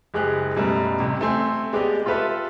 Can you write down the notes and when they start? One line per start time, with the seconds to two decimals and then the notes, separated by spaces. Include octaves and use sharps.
0.14 F#1 G#3 G4 G#4 F#6
0.56 F#2 B2 G3 A3
1.00 A1 C3
1.21 A3 C4 G#5 C6
1.73 G#3 B3 G4 D5 D#5
2.06 F4 G4 A4 B4 E5